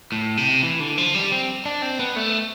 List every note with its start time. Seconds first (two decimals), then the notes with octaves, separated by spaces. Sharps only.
0.12 A2
0.37 C3
0.63 E3
0.80 D3
0.98 F3
1.15 G3
1.32 C4
1.66 D4
1.82 C4
1.99 B3
2.16 A3